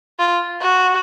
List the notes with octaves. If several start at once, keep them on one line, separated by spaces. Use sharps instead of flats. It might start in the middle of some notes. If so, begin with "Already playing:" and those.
F4
F#4